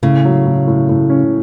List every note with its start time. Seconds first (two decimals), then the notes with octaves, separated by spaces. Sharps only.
0.03 A2 C#3
0.25 F#3
0.46 A2
0.67 A2
0.89 A2
1.10 C#4